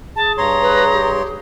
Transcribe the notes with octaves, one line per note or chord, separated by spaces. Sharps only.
G#4 A5
G2 C#5 A#5 C6
B4
G4